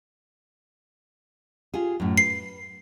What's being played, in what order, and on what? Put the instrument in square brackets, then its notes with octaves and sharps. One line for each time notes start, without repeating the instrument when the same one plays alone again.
[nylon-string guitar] F4 G4 G#4
F#2 A2
[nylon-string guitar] B4 [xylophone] C7